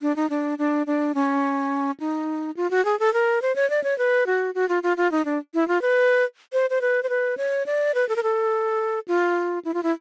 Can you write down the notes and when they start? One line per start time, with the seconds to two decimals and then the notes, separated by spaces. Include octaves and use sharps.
0.02 D4
0.16 D#4
0.30 D4
0.58 D4
0.87 D4
1.15 C#4
2.00 D#4
2.57 F4
2.71 F#4
2.85 G#4
2.99 A4
3.14 A#4
3.42 C5
3.56 C#5
3.70 D5
3.84 C#5
3.98 B4
4.26 F#4
4.55 F#4
4.69 F4
4.83 F4
4.97 F4
5.12 D#4
5.25 D4
5.54 E4
5.68 F4
5.82 B4
6.53 C5
6.70 C5
6.81 B4
7.03 C5
7.09 B4
7.37 C#5
7.66 D5
7.95 B4
8.09 A4
8.16 A#4
8.23 A4
9.08 F4
9.65 E4
9.74 F4
9.83 E4